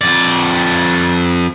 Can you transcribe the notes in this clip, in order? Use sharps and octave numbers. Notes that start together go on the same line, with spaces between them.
F2 D5